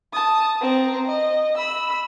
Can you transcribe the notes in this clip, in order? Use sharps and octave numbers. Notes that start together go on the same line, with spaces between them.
A5 D#6
C4 A#5
D#5
B5 E6